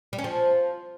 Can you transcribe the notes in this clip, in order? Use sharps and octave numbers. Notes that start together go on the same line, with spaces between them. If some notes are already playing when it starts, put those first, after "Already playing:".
G3
C#4
F3